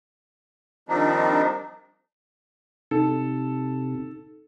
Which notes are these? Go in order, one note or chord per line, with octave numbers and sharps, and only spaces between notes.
D#3 F3 G3 C4 D4 D#4
C3 D#4 A4